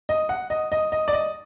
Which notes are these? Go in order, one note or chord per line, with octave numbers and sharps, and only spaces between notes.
D#5
F#5
D#5
D#5
D#5
D5
D#5